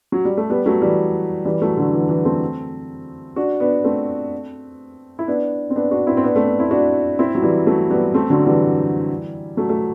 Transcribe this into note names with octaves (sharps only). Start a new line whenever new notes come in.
F#3
G3
A3
G3 B3
F#3 A3
E3 G3
E3 G3
F#3 A3
D3 F#3
E3
E3
A3 C4
D4 F#4
B3 D4
A3 C4
E4
B3 D4
C4
B3 D4
D4 F#4
C4 E4
C4
B3 D4
A3 C4
B3 D4
C4 E4
D4 F#4
C4 E4
F#3
E3 G3
F#3 A3
G3 B3
A3 C4
D3 F#3
E3 G3
F#3 A3
A3